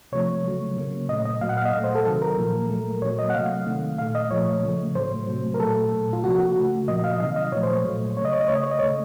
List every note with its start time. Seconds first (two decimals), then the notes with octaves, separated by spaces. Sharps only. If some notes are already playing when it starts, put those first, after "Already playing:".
0.12 C3 F3 A3 C#5
0.44 C#3 F#3 A3
0.77 C#3 F#3 A#3
1.09 A#2 A3 D#5
1.25 D#5
1.41 A#2 F#3 A#3 F5
1.49 F#5
1.57 F5
1.65 D#5
1.73 A#2 A3 F5
1.84 C5
1.95 A4
2.05 C3 D#3 F#3 A4
2.16 A4
2.22 A#4
2.38 A#2 F3 A#3
2.70 A#2 F#3 A3
3.02 A#2 F#3 A#3 C#5
3.19 D#5
3.30 F#5
3.34 C3 F#3 A3 F5
3.66 C3 D#3 A3
3.98 A#2 A3 F5
4.15 D#5
4.31 A#2 F3 A3 C#5
4.63 C#3 F3 A3
4.95 A2 F#3 A3 C5
5.27 C3 F#3 A3
5.54 A#4
5.59 A#2 F#3 A3 A4
5.92 A#2 A3
6.13 F4
6.24 C3 F3 A#3 F#4
6.40 F#4
6.56 C#3 A3
6.88 A#2 F3 A#3 D#5
7.04 F5
7.13 D#5
7.20 C3 D#3 F#3 F5
7.36 D#5
7.52 A#2 F3 A3 C#5
7.63 C5
7.73 C#5
7.85 A#2 F#3 A3
8.17 A3 C#5
8.21 C#3 D#5
8.33 C#5
8.40 D#5
8.48 C#3 A3 C#5
8.55 D#5
8.63 C#5
8.71 D#5
8.79 C#3 A3 C#5